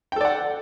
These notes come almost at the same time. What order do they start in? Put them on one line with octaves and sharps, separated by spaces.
G5 A4 D5 F#5